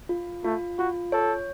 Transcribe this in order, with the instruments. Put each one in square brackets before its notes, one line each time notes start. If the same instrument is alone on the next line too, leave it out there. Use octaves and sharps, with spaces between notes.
[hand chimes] F4
[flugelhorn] A3 [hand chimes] F4
[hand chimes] F4 [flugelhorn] F#4
[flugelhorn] A4 [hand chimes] C#5